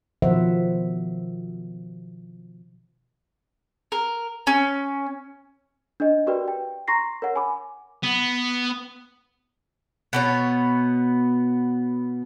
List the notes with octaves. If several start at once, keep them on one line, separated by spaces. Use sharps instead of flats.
B2 D#3 F3 C5 E5 F#5
A#4
C#4
D4 D#5
F#4 G4 A#4 B4 D5 G5
G5
A#5 C6 C#6 A#6 C7
A#4 C#5 F#5
G#5 B5 D6
B3
B2 B3 C#5